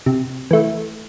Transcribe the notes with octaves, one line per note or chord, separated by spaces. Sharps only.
C3
E3 A3